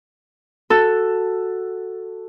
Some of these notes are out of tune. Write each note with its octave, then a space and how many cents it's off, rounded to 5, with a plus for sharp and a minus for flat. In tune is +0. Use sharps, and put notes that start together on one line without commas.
F#4 +0 A4 +5